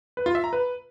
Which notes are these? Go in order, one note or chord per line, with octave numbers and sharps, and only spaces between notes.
B4
F4
E5
A#5
B4